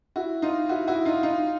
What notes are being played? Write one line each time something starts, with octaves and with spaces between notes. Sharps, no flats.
E4 F#4
D#4 F4
E4 F#4
E4 F#4
D#4 F4
D#4 F4